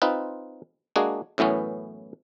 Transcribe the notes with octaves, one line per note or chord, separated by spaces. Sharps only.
C4 D#4 F4 B4
G#3 A#3 D4 F#4 G#4
F#2 A2 E3 B3 C#4